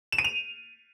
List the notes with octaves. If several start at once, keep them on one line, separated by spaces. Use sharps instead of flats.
E7
D#7
F7